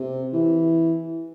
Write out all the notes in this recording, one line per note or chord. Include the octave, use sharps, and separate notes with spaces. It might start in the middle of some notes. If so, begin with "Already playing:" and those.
Already playing: C3
E3